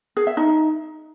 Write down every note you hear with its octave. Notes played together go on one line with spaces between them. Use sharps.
G#4
E5
D#4